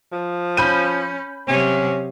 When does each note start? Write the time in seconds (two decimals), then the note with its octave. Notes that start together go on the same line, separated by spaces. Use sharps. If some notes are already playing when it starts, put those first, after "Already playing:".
0.12 F3
0.57 C#4 B5 G6 D#7
1.48 C3 F#3 C#4